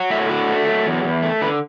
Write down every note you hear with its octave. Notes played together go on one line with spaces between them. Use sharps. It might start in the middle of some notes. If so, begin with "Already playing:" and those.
Already playing: F#3
A2 E5
D3 F#4
A3
F#3
E2
E2
A3
D3 B4